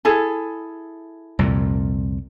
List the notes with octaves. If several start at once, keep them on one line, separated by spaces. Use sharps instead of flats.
E4 G#4 A4
C2 F2 A#2